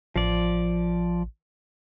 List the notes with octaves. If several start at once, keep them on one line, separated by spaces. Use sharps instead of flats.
A1 F3 D5